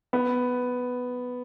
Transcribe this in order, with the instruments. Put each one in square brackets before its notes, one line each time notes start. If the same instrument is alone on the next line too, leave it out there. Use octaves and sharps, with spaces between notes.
[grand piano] B3